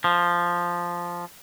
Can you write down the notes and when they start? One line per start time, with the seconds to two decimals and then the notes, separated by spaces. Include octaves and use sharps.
0.04 F3